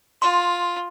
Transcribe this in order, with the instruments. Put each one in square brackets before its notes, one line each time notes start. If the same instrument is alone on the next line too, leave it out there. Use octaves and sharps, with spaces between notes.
[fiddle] F4 [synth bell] C6